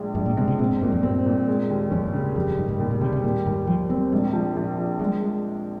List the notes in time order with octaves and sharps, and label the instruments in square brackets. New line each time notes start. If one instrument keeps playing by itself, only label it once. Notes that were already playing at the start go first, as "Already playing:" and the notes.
Already playing: [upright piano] A#1 G#3
[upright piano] A#1 [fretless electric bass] G2
[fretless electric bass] A#2
[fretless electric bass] C3 [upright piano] G#3
[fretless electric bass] C3
[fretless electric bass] A#2 [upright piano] C4
[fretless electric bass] G#2
[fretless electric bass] G2 [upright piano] A#2
[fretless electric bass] F2
[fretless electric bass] G2 [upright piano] C4
[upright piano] A#2
G#3
D#2
[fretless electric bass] F2 [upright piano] C#4
[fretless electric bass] G2
[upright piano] C#3
[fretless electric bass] F2 [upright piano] G3
[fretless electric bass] F2
[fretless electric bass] G2 [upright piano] D#3
[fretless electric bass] G#2
[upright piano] D#2 [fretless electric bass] A#2
[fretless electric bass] A#2
[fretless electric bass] C3 [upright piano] G3
[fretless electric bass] C3
[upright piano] D#2 [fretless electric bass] A#2
[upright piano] D#2 [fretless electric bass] G#2
[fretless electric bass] F3 [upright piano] G3
[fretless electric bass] G3 [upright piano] C4
[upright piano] A#1 [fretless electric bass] G#3
[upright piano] F3
A#1
F3
[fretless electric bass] G3 [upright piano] G#3